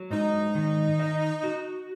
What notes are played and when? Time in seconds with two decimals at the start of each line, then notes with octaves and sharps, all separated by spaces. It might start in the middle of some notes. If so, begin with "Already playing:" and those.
Already playing: F#3
0.10 G#2 D#4
0.55 D#3
1.00 D#5
1.44 F#4